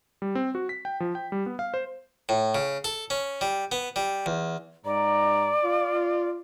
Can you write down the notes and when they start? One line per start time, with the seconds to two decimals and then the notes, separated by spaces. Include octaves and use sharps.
0.22 G3
0.35 C4
0.55 F#4
0.69 B6
0.85 G5
1.00 F3
1.15 G5
1.32 G3
1.46 B3
1.59 F5
1.74 C5
2.29 A2
2.55 C#3
2.84 A4
3.10 C#4
3.41 G3
3.72 B3
3.96 G3
4.26 E2
4.85 G#2 D5 A#5
5.64 F4